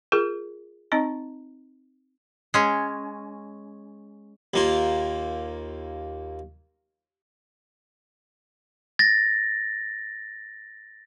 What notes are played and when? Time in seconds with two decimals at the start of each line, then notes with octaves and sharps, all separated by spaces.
0.12 F4 G#4 A#4
0.92 C4 D#4 D#5 A#5
2.54 G#3 C#4
4.54 D#2 A#3 F4
8.99 A6 A#6